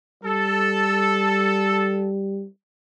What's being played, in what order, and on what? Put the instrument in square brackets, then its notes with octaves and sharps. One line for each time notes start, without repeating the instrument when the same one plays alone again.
[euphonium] G3 [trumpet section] A4